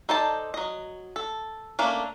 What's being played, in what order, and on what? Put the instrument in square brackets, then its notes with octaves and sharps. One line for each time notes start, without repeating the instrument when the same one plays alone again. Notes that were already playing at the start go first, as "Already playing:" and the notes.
[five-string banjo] D#4 A4 C5 D5 A5
F#3 D#5
A4
A3 A#3 C#4 D4